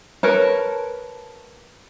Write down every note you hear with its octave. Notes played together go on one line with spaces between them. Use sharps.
A#4 B4 C#5 A5